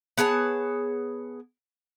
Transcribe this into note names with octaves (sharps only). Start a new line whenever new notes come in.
B3 G#4 C#5 A5